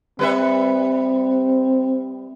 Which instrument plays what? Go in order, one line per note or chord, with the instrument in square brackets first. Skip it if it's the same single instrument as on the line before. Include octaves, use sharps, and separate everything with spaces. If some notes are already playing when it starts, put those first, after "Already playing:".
[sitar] G3 B4 E5 [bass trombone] C4